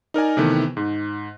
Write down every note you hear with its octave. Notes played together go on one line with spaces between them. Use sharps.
D#4 A#4 D5 G#5
C3 D#3 E3 A3 B3
G#2